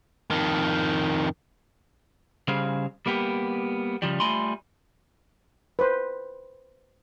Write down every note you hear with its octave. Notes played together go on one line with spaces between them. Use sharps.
F2 D#3
C#3 G3 G#4 C5 F5
G3 A#3 B3 G4
C#3 F3 G3
G3 A3 F4 G#5 B5 C6
B4 C5